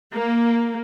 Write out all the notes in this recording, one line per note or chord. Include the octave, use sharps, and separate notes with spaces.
A#3